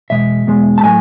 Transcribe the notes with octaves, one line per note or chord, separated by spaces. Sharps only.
E2 B2 G#3 E5
E2 B2 G#3
A5
A2 F#3 A3 G#5